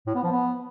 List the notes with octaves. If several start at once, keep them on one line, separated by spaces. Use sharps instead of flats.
A2
B3
F3
B3